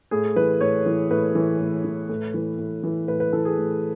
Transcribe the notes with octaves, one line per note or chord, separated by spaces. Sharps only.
A2 G#4
E3 B4
A2 C#5
E3
A2 B4
E3
A2
E3
A2
E3
A2
E3
A2 B4
B4
E3 A4
G#4
A2